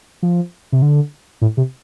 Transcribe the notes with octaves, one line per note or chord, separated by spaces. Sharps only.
F3
C3
D3
A2
C3